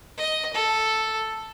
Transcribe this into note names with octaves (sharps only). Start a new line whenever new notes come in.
D#5
A4